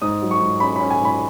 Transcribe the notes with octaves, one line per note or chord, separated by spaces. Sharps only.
G#2 D#6
F#3
C#6
G#2
C#4 B5
C#4 B5
G#5
G#2 B5